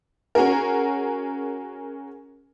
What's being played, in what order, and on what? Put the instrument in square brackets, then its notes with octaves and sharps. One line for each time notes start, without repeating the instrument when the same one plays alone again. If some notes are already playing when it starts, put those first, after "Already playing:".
[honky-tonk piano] C#4 F#4 G#4 A#4